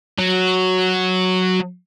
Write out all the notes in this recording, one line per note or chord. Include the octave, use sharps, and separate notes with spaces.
F#3